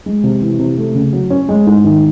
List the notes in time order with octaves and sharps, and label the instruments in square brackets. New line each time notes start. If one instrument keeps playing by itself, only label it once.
[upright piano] G#3
C3
E3
C3
A3
C#3
F#3
C#4
G#3
G#2
D#3